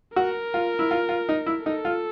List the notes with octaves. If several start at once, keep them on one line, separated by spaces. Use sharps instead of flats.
F#4 A#4
F4
E4
F4
F4
D#4
E4
D#4 A4
F4